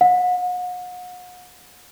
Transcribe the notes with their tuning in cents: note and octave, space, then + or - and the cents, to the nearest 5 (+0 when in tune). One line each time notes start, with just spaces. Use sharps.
F#5 -40